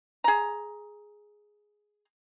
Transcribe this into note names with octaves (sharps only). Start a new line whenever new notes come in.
G#4 A#5